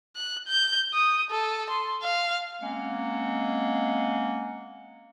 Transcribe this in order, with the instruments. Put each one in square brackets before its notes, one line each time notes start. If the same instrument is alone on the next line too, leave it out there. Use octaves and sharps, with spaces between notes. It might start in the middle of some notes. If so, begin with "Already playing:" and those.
[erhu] F#6
G6
D#6
A4
C6
F5
[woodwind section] G#3 A#3 C4 C#4 F#5